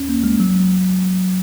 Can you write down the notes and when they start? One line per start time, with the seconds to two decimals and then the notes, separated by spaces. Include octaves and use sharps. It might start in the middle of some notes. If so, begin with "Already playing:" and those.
Already playing: C#4
0.09 A#3
0.24 G#3
0.40 F#3